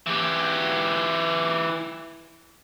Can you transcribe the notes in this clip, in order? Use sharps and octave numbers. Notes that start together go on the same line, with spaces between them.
E3 G4